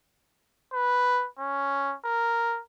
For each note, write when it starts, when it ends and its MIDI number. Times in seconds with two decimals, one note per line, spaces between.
0.73 1.27 71
1.39 1.96 61
2.05 2.60 70